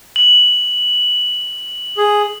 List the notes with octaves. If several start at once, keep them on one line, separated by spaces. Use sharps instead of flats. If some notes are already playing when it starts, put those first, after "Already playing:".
F#7
G#4